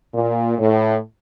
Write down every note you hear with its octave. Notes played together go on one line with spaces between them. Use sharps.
A#2
A2